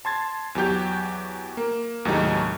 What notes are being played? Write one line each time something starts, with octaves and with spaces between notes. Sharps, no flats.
A5 C6 G#6 A6
E2 F#3 G4 G6
A#3
D#2 A2 C3 F#3 G#3 D#4